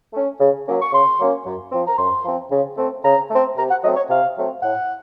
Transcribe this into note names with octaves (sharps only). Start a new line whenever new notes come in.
A3 C#4
C#3
F#3 A#3 C#4
C#6
C#3 C6
F#3 A#3 C#4
F#2
F3 C4
A#5
F#2 C6
F3 C4
C#3
A3 C4
C#3 A#5
A3 C4
C3 A#5
F#5
F#3 A3 C4 D#5
C#5
C3 F5
F#3 A3 C4
A2 F#5